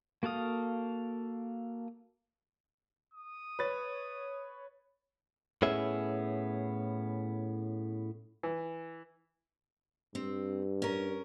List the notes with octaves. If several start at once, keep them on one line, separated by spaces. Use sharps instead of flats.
A#3 F#4 A4 F5 D#6
D#6
B4 C#5 A6
A2 B3 C#4 G#4 E5
E3
G2 C4
C#4 A#4